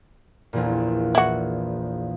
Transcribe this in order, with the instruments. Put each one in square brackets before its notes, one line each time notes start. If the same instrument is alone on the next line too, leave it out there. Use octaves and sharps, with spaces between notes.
[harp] A#1 E2 A#2
[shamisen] E4 F#4